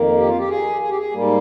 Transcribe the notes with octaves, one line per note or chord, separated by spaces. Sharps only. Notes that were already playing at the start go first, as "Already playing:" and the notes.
Already playing: F2 D#3 A#3
G4
F4
G4
G#4
G#4
G4
G#4
G#2 G3 A#3